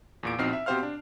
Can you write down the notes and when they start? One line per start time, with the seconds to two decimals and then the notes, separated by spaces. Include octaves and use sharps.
0.23 E2 A#2 D7
0.38 A#1 B2 C4 D#4 F6 C7
0.53 E5
0.66 B2 C4 G4 C5 F5 F6
0.83 D4